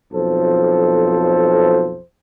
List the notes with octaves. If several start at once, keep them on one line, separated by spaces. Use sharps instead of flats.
B1 F2 F3 A4 C5